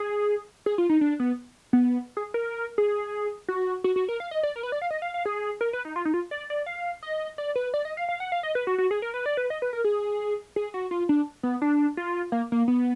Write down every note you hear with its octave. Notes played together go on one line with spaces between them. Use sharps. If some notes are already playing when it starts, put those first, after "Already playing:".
Already playing: G#4
G#4
F4
D#4
D4
B3
B3
G#4
A#4
G#4
F#4
F#4
F#4
A#4
F5
D#5
D5
A#4
B4
D5
F5
D#5
F5
F5
G#4
A#4
B4
D#4
F4
D#4
F4
D5
D5
F5
D#5
D5
B4
D5
D#5
F5
F5
F#5
F5
D#5
B4
F#4
F#4
G#4
A#4
B4
D5
B4
D#5
B4
A#4
G#4
G#4
F#4
F4
D4
B3
D4
F4
A#3
A#3
B3